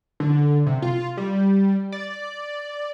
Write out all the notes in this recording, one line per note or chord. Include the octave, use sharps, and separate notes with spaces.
D3
C3
F4
G3
D5